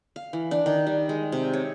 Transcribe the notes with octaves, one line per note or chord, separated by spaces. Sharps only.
F5
E3
D4
D#3
G3
G#3
C3
C#5